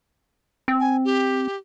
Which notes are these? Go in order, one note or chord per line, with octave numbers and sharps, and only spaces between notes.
C4
G#5
G4